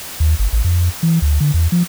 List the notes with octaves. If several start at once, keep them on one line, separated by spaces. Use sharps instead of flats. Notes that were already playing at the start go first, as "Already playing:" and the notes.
D#2
G1
A1
F2
E3
D2
D3
E2
F3